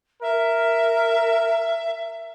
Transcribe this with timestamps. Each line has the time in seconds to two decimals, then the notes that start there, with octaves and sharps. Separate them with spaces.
0.22 A#4 E5